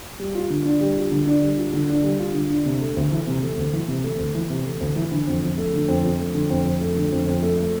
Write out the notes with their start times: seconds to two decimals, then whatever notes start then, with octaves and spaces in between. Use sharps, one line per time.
0.19 G3
0.35 F4
0.50 D3
0.65 D4
0.81 G3
0.97 F4
1.12 D3
1.27 D4
1.42 G3
1.57 F4
1.73 D3
1.89 D4
2.04 G3
2.19 F4
2.34 D3
2.50 D4
2.65 C3
2.81 A3
2.97 D2
3.12 E3
3.27 C3
3.42 A3
3.57 D2
3.73 E3
3.88 C3
4.04 A3
4.19 D2
4.35 E3
4.50 C3
4.65 A3
4.81 D2
4.96 E3
5.12 D3
5.27 F2
5.42 F2
5.58 A3
5.73 D3
5.88 F2
6.04 F2
6.19 A3
6.35 D3
6.50 F2
6.65 F2
6.81 A3
6.96 D3
7.12 F2
7.27 F2
7.42 A3
7.57 A3